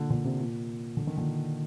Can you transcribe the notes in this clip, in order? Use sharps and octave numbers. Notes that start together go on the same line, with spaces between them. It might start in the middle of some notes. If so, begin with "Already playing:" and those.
Already playing: A#2 D3
A#2 D3
C3
A#2
D3
D#3
A#2 D3